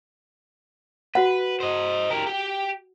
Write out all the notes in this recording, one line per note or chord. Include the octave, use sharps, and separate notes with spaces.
F#4 B4 F#5
C5 D#5
G4 A#4
G4 G5